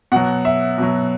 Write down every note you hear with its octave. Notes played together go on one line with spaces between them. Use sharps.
B2 F#3 F#5
E5
B2 F#3